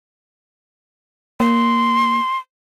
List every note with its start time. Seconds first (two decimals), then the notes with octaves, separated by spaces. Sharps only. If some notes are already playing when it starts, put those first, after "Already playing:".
1.40 A#3 C6